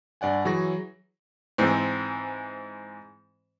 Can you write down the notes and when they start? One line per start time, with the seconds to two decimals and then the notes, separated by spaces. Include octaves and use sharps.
0.21 G2 D5 F#5 G#5
0.45 E3 F#3 G#4 C#6 A#6
1.58 G#2 E3 G#3 C4